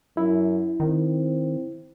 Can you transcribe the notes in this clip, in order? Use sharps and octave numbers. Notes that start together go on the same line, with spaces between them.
F#2 E4
D#3 C4